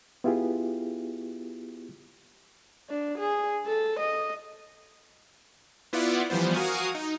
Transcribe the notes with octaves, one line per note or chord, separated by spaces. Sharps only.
B3 E4 F4 G4 G#4
D4
G#4
A4
D#5
B3 E4 F4 D5 F#5
E3 F3 G3 B3 C5
F#4 A#4 F5 G#5 C#6 D#6
D#4